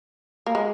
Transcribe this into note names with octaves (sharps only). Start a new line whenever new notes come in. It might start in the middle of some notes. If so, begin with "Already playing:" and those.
A#3
G#3